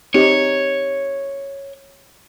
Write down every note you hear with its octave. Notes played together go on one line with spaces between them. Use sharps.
C4 D#4 G4 C#5